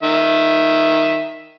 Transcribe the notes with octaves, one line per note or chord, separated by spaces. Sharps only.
D#3 E5